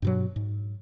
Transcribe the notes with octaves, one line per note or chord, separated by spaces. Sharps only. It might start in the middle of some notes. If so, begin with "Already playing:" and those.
G2 B2 F#3
G#2